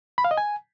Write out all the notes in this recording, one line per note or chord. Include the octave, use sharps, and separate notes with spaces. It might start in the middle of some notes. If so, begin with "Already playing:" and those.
B5
F5
D#5
G#5